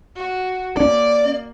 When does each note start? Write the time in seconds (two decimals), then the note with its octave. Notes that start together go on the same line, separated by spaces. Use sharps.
0.17 F#4
0.77 A#3 C#4 D4 D5